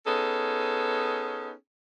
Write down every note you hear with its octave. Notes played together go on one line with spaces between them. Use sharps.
B3 C#4 D#4 G#4 A4